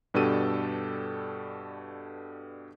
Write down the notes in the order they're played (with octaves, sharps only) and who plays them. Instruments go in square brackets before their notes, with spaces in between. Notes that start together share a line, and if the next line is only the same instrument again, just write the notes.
[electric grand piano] G2 B2 D4 G4 A4 D#7